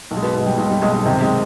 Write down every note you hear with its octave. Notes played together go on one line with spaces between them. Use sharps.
B1
G#3
B2 B3
B2
G#3
G3
B1 G#3
G3
B1 G#3
G#3
C3 D#3 C4
G#3